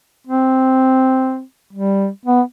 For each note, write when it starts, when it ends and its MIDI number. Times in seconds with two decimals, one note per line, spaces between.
0.27 1.42 60
1.73 2.08 55
2.26 2.41 59